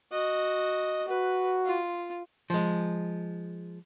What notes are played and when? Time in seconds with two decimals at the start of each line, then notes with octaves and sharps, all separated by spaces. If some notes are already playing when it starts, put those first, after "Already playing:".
0.12 F#4 D#5
1.08 F#4 B4
1.66 F4
2.50 F3 G#3